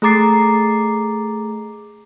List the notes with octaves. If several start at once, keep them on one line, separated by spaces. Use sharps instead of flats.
A3 G#4 A#5 D6 A6 C7